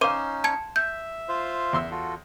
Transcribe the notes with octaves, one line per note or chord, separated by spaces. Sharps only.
C#4 D#4 C5 F5 D6 D#7
A5 G#6 C#7
E5 G6
F4 C5 F5
E2 C6 E6
F4 F#4 A4